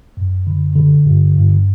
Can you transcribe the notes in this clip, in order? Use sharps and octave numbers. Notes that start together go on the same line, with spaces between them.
F#2
D3
D3
G2
G2